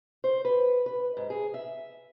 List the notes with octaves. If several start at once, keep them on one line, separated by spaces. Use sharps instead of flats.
C5
B4
B4
G#2
G#4
E5